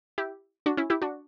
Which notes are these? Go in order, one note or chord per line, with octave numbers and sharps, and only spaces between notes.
E4 G4
D4 F#4
C#4 E4
E4 G4
D4 F#4